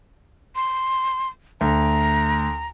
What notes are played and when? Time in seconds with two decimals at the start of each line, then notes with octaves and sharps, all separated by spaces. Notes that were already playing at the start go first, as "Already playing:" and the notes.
0.56 C6
1.61 D2 A#5